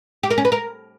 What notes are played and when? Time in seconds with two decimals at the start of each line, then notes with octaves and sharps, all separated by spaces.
0.23 G4
0.30 A#4
0.38 C#4
0.45 B4
0.52 A#4